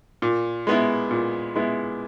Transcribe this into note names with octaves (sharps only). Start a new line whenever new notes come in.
A#2
G#3 B3 E4
A#2
G#3 B3 E4